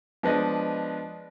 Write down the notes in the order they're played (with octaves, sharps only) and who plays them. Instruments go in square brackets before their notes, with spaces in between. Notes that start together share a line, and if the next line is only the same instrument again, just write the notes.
[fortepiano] F3 G#3 B3 D4 B4 D#5